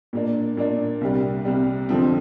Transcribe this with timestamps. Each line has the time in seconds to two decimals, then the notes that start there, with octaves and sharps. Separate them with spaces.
0.13 A#2 A#3 D4
0.57 A#2 A#3 D4
1.01 C2 C3 G3
1.45 C2 C3 G3
1.89 F2 D3 F3 C4